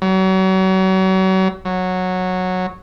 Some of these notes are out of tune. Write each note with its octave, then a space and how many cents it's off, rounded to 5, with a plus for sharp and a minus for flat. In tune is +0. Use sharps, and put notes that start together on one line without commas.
F#3 +35
F#3 -10